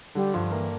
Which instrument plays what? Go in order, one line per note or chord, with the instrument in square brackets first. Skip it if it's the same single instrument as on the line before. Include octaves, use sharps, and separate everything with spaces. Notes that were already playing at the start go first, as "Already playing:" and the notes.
[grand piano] D3 [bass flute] G3
[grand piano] G2 [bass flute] F3
[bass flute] E3 [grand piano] A#3